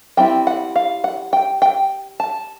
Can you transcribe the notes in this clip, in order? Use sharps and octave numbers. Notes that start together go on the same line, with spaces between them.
G3 C4 E4 G5
F#5
F5
F#5
G5
G5
A5